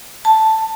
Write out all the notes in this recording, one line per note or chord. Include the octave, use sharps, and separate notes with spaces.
A5